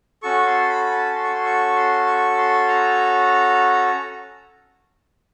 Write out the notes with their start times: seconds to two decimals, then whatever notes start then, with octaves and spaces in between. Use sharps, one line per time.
0.23 C#4 F#4 A4 C#6
0.47 C6
0.69 B5
0.92 A5
1.15 C6
1.24 C#6
1.33 C6
1.46 C#6
1.76 C6
2.07 C#6
2.38 C6
2.68 A#5